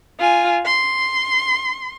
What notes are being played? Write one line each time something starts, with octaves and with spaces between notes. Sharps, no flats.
F4 G#5
C6